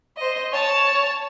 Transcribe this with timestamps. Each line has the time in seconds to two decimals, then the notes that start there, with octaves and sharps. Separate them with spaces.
0.17 C5 D#5
0.52 C#5 A5